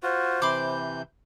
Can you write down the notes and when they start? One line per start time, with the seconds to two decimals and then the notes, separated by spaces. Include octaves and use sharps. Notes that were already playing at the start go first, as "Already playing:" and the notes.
0.03 F4 F#4 C5
0.42 C3 E3 B5 C6 D6 G6